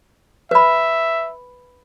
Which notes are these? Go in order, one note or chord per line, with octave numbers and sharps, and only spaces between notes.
B4 E5 B5